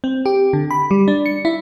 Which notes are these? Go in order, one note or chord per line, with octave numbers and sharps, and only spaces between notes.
C4
G4
D3
B5
G3
D4
C#7
E4